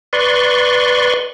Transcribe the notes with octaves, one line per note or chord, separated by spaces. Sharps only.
B4 D5 C6 C#6